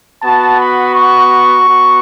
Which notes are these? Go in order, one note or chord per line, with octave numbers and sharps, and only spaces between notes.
B3 F#4 A5
B5
C#6
B3 F#4